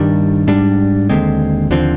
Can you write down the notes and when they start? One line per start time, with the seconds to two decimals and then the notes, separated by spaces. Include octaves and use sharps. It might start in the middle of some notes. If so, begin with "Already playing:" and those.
Already playing: G2 D#3 G3 D4
0.47 G#2 G3 D4
1.09 D#2 D3 G#3 C4
1.70 D#2 D3 F3 C4